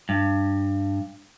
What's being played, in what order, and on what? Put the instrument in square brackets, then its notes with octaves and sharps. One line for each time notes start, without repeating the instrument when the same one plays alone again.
[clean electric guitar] G2